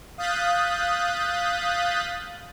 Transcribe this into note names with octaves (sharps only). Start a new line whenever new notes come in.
F5 D#6 F#6 G6 A6 B6